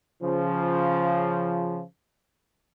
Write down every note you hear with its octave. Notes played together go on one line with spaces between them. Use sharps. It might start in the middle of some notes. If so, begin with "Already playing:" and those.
C#3 F3